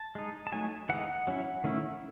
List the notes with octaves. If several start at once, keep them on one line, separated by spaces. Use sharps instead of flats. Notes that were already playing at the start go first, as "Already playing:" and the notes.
Already playing: A5
G#3 D#4
A5
F#3 A3 D#4 G#5
E3 G#3 D#4 F#5
F#3 C#4 E4
D#3 A3 C#4 E4